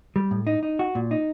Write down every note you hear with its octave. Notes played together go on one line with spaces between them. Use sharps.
G3
A2
D#4
D#4
F#4
A#2
D#4